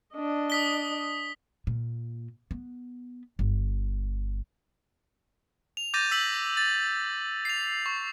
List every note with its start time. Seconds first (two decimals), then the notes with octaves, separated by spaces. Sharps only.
0.14 D4 D#5
0.50 D#6 B6 G7
1.67 A#2
2.51 B3
3.39 G1
5.77 F7
5.94 D6 G6 A6 A#6 D#7
6.11 E6 B6 F#7
6.57 A6
7.45 C7 F7
7.86 C#6